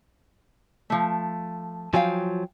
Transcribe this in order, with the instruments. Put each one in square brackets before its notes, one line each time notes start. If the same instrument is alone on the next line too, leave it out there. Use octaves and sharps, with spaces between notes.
[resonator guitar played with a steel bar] F3 A3
[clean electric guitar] F3 F#3 [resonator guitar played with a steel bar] F5 G5 G#5